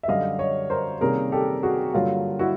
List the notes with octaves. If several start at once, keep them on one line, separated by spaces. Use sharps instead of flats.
E5
F#2 D3 G3 D#5 F5
C#5 D#5
A#4 C5
C3 D#3 G3 A#3 C#4 G#4 A#4
G4 A4
F#4 G#4
G2 D3 F#3 A#3 F4
E4 F#4